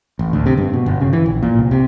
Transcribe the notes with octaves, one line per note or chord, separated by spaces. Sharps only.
A1
D2
C3
G2
B2
G1
C#3
E3
A#1
A#2
C2
C3